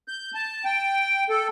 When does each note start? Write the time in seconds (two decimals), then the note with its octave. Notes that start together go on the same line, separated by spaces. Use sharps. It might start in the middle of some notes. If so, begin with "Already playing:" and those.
0.08 G6
0.34 A5
0.65 G5
1.30 A4